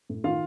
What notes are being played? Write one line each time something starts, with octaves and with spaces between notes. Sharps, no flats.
A2
D#3 F4 F5